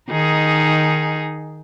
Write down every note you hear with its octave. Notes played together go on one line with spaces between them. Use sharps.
D#3 D#4 G#4